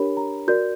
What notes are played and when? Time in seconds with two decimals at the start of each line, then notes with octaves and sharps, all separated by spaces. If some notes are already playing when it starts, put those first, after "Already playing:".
Already playing: D4 G4 A#4 C#5 B5
0.17 A#5
0.48 F#4 A#4 D5 G6